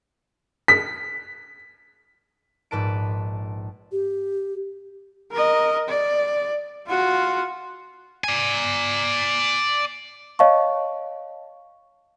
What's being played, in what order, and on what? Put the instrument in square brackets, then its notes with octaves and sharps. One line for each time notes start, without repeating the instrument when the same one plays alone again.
[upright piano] B6
[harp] A#1 G#2 B4 A5 D7
[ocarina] G4
[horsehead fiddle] A#4 D#5
D5
F4 F#4
[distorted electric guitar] D5 G#5
[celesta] C#5 D#5 F5 A5 C#6